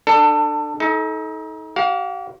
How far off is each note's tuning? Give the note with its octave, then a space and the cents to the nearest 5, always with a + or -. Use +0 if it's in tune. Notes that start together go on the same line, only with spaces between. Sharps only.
D4 +30 A4 +20
D#4 +30 A4 -25
G4 -45 F5 +25